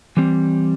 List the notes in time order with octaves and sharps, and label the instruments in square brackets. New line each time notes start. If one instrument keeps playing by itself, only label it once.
[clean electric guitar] E3 G3 C4